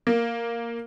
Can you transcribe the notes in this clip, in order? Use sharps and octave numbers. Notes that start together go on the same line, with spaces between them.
A#3